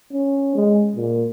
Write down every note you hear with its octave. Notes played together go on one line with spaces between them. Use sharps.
C#4
G#3
A#2